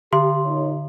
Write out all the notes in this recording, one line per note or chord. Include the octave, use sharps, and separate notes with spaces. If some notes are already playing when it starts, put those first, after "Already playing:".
D3 G4 C6
A#2 D#4 C#5